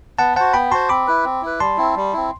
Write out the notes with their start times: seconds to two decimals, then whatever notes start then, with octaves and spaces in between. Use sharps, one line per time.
0.19 B3 F#5 A5
0.36 F#4 C5 F#5 A5
0.53 B3 G5 B5
0.71 F#4 C5 A5 C6
0.89 C4 B5 D6
1.07 E4 B4
1.25 C4
1.42 E4 B4
1.60 G3 A5 C6
1.77 C4 E4
1.96 G3
2.13 C4 E4